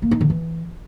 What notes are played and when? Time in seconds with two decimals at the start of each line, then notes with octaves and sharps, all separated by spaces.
0.02 A#3
0.11 D#4
0.21 D3
0.30 E3